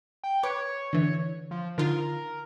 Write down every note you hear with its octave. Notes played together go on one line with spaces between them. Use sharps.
G5
B4 C#5 D6
D3 E3
F3
D3 D#4 F4 A#4